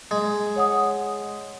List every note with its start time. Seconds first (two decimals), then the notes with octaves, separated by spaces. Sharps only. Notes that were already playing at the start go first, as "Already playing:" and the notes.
0.11 G#3
0.56 C#5 F#5 D#6